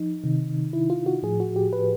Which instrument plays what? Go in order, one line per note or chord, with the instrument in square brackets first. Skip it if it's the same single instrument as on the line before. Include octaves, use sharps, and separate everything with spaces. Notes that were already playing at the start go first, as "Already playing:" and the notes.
Already playing: [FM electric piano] F3 D#4
C3 D#3
E4
F4
F#4
A2 F3 G#4
F#4
G4
B4